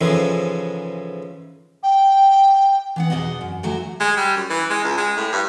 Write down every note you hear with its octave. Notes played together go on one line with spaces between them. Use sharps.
G#2 C#3 E3 F3 G#3 A3
G5
E3 B3 F#5
E2 B2 D#3 D5 D#5 F#5
F#2
D2 F#3 A3 F#4
G#3
G3
F#2
E3
G#3
C#2
G#3
A2
G2